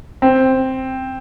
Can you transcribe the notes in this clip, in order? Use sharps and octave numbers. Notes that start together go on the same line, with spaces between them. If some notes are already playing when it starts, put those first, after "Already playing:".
C4